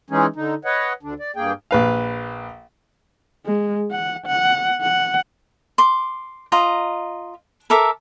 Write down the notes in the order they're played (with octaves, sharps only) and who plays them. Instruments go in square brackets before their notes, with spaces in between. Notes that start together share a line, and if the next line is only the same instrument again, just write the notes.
[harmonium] E3 G#3 C#4 D#4 G#4
D3 D#4
B4 C#5 D#5 F#5
D2 D3 D4
D5
G2 A#3 G#4 G5
[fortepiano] A#1 B4 F5
[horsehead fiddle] G#3
F#5
F#5
F#5
[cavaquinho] C6 D6
F4 D#5 A#5
A4 A#4 E5 D6